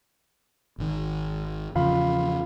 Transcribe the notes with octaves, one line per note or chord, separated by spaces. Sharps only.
G#1 D#3
E2 C#3 F3 F4 F5 B5